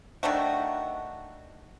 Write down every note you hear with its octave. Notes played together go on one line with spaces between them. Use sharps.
D#3 A3 D4 F#4